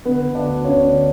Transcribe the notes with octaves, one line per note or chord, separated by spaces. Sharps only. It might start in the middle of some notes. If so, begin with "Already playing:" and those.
D3 B3 B4
D3
D4 D5
D2
D2 C#4 C#5
D3